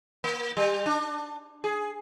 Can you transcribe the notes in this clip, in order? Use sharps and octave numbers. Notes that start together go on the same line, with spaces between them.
A#3
G3
D4
G#4